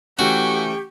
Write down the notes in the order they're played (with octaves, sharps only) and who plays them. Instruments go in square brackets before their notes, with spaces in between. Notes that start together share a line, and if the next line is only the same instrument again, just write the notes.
[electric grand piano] E3 A3 C#4 [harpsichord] F#4 [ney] G4 [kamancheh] G5 C#6